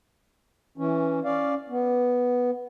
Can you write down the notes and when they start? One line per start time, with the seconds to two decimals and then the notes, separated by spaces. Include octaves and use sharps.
0.78 E3 C#4
1.24 C#4 D5 F5
1.69 B3